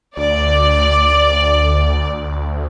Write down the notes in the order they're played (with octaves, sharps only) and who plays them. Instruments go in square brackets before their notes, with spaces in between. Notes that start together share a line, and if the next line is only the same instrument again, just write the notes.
[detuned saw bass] D2 [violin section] D5